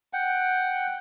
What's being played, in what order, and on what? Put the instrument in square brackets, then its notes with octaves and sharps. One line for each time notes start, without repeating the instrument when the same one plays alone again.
[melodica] F#5 G5